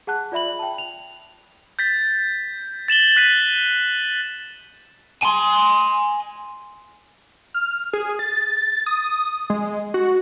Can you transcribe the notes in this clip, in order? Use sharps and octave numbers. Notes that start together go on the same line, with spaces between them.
G#4 F#5 A5 F#6
F4 D5 E5 B5 F#7
G5 A5
F7
G6 A6 B6
A6 E7 F#7 G7
F#6 B6 D#7 G7
G#5 C6
F6
G#4
A6
D#6
G#3
F#4